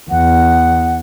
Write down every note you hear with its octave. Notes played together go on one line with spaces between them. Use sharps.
E2 F#5